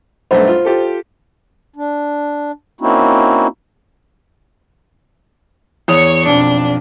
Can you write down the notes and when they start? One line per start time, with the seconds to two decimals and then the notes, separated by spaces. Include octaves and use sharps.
0.31 B1 G2 A3 C5
0.48 F4
0.65 F4 G4 A4
1.76 D4
2.81 A#3 C4 C#4 D#4 E4 F#4
5.88 E2 C#5 C#6 D#6 F7
6.26 B1 F2 D4